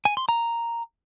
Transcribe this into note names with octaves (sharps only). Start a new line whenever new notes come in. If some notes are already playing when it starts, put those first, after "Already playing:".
G#5
C6
A#5